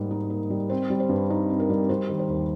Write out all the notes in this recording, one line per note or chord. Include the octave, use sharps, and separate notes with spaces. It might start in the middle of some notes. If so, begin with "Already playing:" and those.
Already playing: G#2 G3 A#3
D#4
A#3
G3
C4 C5
G3
C5
G2
D#4
C4
A#4
G3
G3 C5
D#3
C5
D#2